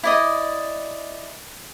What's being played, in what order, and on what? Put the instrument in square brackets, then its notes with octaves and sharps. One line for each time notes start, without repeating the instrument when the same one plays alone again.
[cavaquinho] E4 D5 D#5